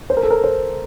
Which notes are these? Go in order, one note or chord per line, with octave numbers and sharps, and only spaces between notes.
C5
A#4
A4
A#4
C5